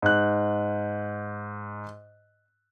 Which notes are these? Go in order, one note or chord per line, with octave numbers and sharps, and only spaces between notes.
G#2 F#6